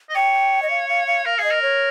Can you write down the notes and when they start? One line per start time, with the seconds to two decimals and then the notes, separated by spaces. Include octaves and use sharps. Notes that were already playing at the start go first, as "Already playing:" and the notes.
0.09 D#5
0.15 C#5 G5
0.62 D#5
0.70 F5
0.89 F5
1.08 F5
1.26 A#4 F5
1.38 G#4 F5
1.44 D#5
1.51 A#4
1.62 C#5